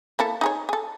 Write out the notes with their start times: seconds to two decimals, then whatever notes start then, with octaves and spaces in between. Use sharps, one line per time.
0.19 A#3 E4 A4
0.41 D#4 G#4 C#5
0.69 G#4 A4